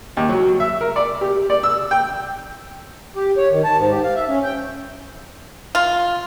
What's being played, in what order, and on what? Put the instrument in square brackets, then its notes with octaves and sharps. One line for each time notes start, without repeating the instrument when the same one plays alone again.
[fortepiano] D#2
F#3
E5
A#4
D5
G4
D5
E6
G5
[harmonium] G4
C#5
D#3
A5
G#2
G4
F5
E5
C#4
G5
[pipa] F4